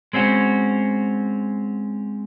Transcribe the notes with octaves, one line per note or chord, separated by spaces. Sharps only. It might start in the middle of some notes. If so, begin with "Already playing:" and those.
G#3 C4 C#4 F#4